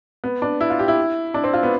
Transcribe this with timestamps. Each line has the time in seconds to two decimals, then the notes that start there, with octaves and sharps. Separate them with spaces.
0.24 B3
0.42 D4
0.61 E4
0.70 F4
0.79 G4
0.88 E4
1.34 D4
1.44 C4
1.54 F4
1.63 B3